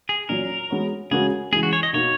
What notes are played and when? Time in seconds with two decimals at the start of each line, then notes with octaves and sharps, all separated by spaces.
0.09 G#4
0.29 A#2 F#3 C#4 A#4
0.70 G#3 B3 F#4 C#5
1.11 C#3 G#3 C#4 F#4 G#4 A#4
1.52 G#3 G#4
1.55 C#3 E3
1.63 F#4
1.73 C#5
1.83 D#5
1.93 B2 A#3 D#4 C#5